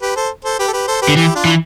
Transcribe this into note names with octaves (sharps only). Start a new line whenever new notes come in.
G4 B4
A4 C5
A4 C5
G4 B4
A4
G4 B4
A4 C5
G4 B4
D3
E3 E4 G4
D4 F4
E3 E4